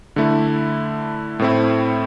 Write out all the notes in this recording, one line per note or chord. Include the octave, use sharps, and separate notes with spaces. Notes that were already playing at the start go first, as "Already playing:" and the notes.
D3 A3 E4
A2 A3 C4 E4